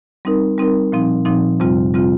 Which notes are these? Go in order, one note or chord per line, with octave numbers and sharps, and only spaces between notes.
G3 C4 D#4 A#4
G3 C4 D#4 A#4
A#2 F3 C4 D#4
A#2 F3 C4 D#4
F2 C3 G3 C4 F4
C3 G3 C4 F4